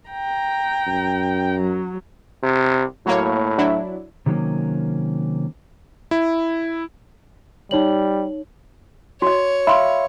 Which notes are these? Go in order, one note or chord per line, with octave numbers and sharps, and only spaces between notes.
G5 A#5
F#2
F#3
C3
A2 F#3 A#3 C#5
F#3 D4 E4
C3 D#3 F#3 G3 A#3 C#4
E4
G3 D#4 C#5 F#7
F#4 C#5 D#5
E5 F5 B5 C6